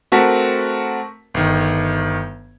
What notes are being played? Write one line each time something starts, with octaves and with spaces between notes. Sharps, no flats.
A3 C4 F#4 A#4 A5 B6
G1 D#3